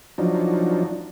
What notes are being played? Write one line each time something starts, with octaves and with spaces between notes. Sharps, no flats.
F3 F#3 D4 D#4